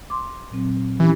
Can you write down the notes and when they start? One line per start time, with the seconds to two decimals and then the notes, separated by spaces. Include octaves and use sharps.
0.10 C6 D6
0.51 A#2 F#3 C4
1.00 E3 C#4 E4 G4